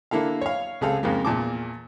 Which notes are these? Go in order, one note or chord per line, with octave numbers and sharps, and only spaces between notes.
D3 A#3 E4 A4 F5
C#5 F5
C#2 C4 G#4 A4 F5
F2 G#2 C#3 G#3 A#3
E2 A#2 A5 D6